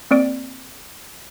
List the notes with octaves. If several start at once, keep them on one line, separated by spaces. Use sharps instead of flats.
A#3 C4 D5 D7